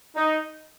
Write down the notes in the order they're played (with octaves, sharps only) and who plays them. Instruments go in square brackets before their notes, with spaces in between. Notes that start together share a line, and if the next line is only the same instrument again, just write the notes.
[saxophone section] D#4